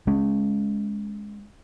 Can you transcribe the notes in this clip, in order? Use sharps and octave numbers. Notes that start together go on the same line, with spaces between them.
G#3 C#4